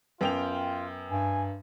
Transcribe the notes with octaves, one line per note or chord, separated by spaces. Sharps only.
F#2 B3 F4 G5 F7
G2 G#5